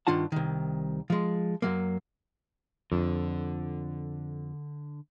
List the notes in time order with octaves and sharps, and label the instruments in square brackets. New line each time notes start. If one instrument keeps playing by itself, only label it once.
[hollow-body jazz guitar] G2 D#3 D4 F4 F#5 A5
C2 D#3
F3 G#3
F#2 F#3 A#3
[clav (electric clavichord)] F2 [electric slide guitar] D3